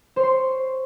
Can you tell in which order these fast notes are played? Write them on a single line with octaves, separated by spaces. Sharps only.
C5 C#5 C6